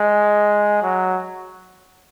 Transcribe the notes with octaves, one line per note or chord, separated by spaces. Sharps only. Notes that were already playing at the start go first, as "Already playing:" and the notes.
Already playing: G#3
F#3